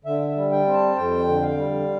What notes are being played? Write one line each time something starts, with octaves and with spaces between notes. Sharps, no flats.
D3 E5
E5
G3
G5
C4
A5
F2 G5
D3
F5
G3